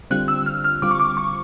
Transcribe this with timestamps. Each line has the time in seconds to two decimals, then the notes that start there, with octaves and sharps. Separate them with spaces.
0.11 D3 G3 C4 F4 F#6
0.28 E6
0.46 F6
0.64 F6
0.82 D3 G3 C4 F4 D6
0.91 C#6
1.00 D6
1.17 C#6